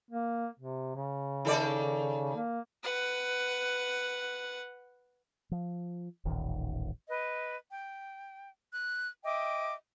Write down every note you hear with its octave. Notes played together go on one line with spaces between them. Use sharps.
A#3
C3
C#3
D#3 A4 D5
A#3
B4 F#5
F3
D#1 A1 D#3
B4 D#5
G5
F#6
D#5 E5 G5 D6